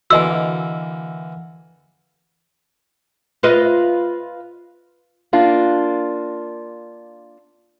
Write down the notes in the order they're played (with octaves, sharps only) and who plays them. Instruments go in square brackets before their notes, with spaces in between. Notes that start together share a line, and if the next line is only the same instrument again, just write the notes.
[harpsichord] D3 E3 A#3 [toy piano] F#4 D#5 G#5 [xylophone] E6
[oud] F4 B4 D#5
[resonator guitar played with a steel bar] A#3 D4 F4